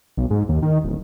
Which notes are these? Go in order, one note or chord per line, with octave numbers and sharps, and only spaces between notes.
B1
G#2
D#2
D#3
D1